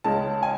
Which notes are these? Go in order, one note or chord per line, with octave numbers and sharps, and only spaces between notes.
C#2 C#3 G#3 A5
G#5